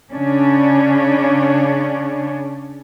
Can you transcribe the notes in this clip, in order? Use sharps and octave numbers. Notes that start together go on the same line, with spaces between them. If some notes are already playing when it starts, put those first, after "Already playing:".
C#3 C#4 D4